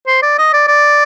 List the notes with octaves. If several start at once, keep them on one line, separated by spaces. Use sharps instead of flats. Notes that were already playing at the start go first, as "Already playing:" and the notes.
C5
D5
D#5
D5
D5